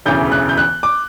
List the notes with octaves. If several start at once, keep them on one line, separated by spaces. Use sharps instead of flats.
E1 D2 C#3 E3 G6
F#6
G6
F#6
D6